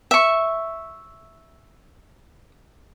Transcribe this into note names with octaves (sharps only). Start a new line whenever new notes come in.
E5 C#6